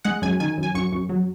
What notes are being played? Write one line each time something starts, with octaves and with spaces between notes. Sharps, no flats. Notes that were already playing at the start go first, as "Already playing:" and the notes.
G#3 F#5
F#2 G#5
D#3 G#5
F#2
G#5
F#2 C#6
F#2
F#3